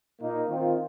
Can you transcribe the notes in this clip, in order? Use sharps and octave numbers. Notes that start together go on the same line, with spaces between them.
A#2 A#3 D#4
D#3 C4 F4